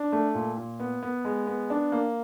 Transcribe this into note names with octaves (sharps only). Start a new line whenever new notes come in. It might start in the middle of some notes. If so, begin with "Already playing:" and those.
Already playing: D4
A3
A#2
A#2
B3
B3
G#3
B3
D4
A#3